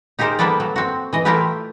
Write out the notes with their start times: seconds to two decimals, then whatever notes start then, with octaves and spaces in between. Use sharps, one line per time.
0.19 D#4 G4 G#4 A#4 C5
0.39 G3 A#3 B3 A4 B4 D5
0.60 F#3
0.76 C4 F#4
1.13 E3 D#5
1.25 A3 E4 F4 G4 A#4 B4